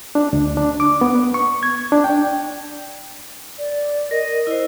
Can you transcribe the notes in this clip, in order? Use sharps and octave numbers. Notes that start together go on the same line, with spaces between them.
D4
D2
D4
D6
B3
C#6
G#6
D4
G5
D5
A#4 D#5
E4 C5